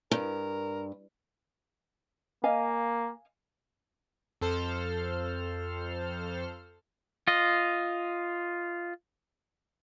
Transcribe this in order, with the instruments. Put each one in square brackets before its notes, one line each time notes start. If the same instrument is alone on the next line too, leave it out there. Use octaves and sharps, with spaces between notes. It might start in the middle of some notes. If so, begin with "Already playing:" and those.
[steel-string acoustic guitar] G2 [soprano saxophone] A#4
[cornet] A#3 [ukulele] D#5 F5 G#5
[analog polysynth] F2 A4 C5 F6
[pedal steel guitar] F4 D#5